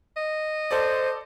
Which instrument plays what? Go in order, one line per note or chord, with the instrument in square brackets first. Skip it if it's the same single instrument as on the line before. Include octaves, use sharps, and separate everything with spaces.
[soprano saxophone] D#5
[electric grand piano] A4 D5 [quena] C5